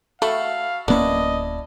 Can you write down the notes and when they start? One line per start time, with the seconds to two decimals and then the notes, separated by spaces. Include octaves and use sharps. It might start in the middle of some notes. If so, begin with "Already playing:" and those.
0.22 A3 F#4 A4 F5 B5
0.88 D1 A#3 B3 C#4 D4 E4 D#5